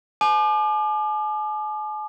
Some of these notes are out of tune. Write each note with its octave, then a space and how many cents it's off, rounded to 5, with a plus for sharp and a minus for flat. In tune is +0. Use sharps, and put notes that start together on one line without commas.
G#5 +45 D6 +35